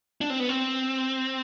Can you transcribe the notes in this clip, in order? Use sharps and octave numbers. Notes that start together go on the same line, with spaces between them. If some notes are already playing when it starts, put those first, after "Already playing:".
D4
C4
B3
C4